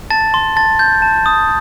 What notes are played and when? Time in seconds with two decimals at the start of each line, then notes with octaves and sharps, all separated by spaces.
0.10 A5 A6
0.34 C6
0.56 A5 A6
0.79 G6
1.02 A5
1.26 D#6